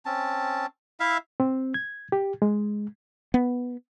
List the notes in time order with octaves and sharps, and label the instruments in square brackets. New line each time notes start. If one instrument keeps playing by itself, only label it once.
[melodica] C4 C#4 A5
E4 E5 F5
[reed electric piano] C4
G#6
G4
G#3
[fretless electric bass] B3